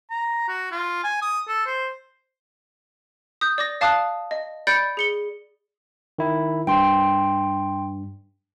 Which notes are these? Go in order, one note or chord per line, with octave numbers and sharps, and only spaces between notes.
A#5
F#4
F4
G#5
D#6
A4
C5
D#6 G6
D5 D6 A#6
D5 F5 A5 D6 D#6 F#6
D#5
D5 B5 G6 A6 C#7 D7
G#4 C#7 G7
D#3 E4
G2 G5 C6